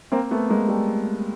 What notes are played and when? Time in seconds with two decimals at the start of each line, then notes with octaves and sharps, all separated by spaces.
0.12 A#3 C4
0.31 A3 B3
0.49 G#3 A#3
0.69 G3 A3